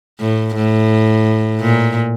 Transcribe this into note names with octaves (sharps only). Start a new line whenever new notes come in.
A2
A2
A#2